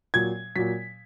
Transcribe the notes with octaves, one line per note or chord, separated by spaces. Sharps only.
A#2 F#3 G#6
A#2 F#3 B6